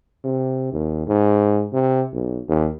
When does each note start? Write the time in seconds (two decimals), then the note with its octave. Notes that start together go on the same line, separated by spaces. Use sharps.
0.24 C3
0.73 D#2
1.07 G#2
1.73 C3
2.13 B1
2.48 D#2